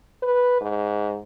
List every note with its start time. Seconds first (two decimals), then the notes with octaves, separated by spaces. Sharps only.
0.22 B4
0.61 G#2